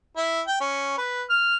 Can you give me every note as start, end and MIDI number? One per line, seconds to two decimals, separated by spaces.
0.17 0.41 64
0.47 0.58 79
0.61 0.96 61
0.98 1.24 71
1.30 1.56 89